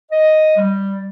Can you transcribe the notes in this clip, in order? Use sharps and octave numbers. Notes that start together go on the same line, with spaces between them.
D#5
G3